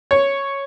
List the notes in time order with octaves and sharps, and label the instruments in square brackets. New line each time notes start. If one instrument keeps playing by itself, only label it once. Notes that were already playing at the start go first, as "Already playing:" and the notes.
[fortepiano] C#5